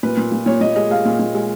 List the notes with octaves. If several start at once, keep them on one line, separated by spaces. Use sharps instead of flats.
A#2 B4
A#2
A#2
A#2 C#5
A#2 D#5
G#3 D#5
G#3 F5
A#2
A#2
G#3